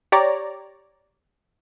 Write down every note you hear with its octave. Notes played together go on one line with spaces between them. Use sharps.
G4 C#5 D5 A#5